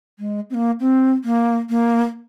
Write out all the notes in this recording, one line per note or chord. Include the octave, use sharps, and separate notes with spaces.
G#3
C4
A#3
C4
A#3
A#3